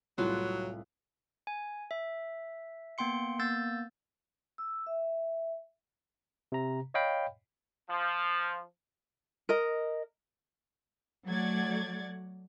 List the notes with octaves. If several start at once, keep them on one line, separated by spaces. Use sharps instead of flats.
C2 A2 F#3 F4 B4 F5 F#6
G#5
E5
A#3 B3 G5 C6 C#7
A#3 B3 E6 G6 A6
E6
E5
C3 A#5
C#5 D#5 F5 G5 B5
F3
A#4 D#5
F#3 A3 D5 F#5 G#6 A6